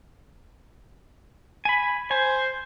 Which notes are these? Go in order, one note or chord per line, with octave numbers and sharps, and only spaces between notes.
G#5 B5
C5 G#5